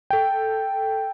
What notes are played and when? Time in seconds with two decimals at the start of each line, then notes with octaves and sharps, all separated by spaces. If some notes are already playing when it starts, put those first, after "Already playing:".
0.10 A4 G5